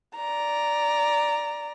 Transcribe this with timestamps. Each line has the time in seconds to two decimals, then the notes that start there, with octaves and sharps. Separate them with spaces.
0.17 D5 A#5